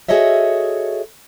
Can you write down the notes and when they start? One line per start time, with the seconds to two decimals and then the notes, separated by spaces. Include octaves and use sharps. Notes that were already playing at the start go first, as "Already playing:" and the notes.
0.08 F#4 G#4 A4 C#5 D#5 E5